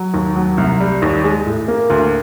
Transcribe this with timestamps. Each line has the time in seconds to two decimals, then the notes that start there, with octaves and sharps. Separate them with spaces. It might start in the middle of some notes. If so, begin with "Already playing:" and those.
Already playing: F#3
0.14 D#2
0.36 F#3
0.58 C2
0.80 G3
1.02 D#2
1.24 G#3
1.46 A2
1.68 A#3
1.90 D2